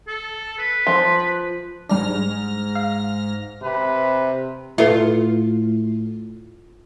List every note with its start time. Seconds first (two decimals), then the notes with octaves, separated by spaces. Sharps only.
0.07 A4
0.58 B4
0.87 F3
1.89 G#2 G3 D4 F6 A#6
2.75 F5
3.62 C3 B4
4.78 A2 F4 A4 B4 E5